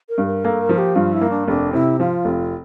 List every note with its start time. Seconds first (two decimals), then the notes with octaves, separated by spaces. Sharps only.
0.09 A#4
0.18 G2
0.26 A#4
0.45 A#3 A4
0.61 A#4
0.69 F3
0.78 G4
0.95 G2 F4
1.13 E4
1.21 A#3
1.30 D4
1.48 F1 D4
1.73 C3 E4
2.00 F3 F4
2.25 F1